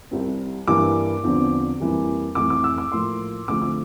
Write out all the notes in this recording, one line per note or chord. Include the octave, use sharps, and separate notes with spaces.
C2 C3 G3 C4
G2 E3 G3 A#3 D6
E2 D3 F3 C4
F2 E3 G3 A#3
F2 E3 A3 D6
D6
E6
D6
A2 F3 A#3 C6
D2 D3 F3 A3 C4 D6
D6